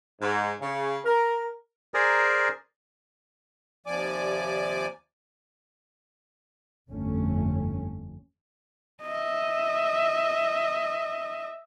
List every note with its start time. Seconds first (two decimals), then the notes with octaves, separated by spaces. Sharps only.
0.21 G#2
0.61 C#3
1.05 A#4
1.94 G#4 A#4 C5 D5 G#5 A#5
3.86 D#2 C3 F3 D5 G#5 D6
6.90 G1 F2 A3 C#4
9.04 D#5 E5